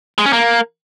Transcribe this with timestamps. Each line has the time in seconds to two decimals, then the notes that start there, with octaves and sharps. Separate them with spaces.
0.18 G#3
0.26 C#4
0.33 A#3